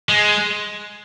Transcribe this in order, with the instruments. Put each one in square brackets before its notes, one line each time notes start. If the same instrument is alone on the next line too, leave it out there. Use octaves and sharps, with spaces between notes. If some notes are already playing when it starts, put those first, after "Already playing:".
[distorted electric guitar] G#3